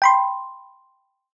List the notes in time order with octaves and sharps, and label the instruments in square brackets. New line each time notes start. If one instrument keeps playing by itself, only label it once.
[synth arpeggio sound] G5 B5 C6